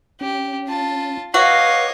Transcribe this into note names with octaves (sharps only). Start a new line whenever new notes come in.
C#4 G4
F4 A5
F#4 B4 C#5 D#5 F5 D6